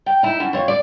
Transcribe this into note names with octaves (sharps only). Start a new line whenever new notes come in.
G5
D#4 E4
F#2
F2 C#5
D5